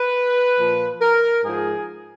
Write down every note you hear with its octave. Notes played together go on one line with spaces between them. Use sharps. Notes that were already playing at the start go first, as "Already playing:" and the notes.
Already playing: B4
A#2 F3
A#4
G#2 F3 G#4